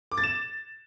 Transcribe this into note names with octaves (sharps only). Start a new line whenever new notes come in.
D6
A6
E7